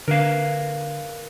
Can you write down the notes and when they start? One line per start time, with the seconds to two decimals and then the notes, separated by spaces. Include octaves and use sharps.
0.08 D3 A#4 B4 F5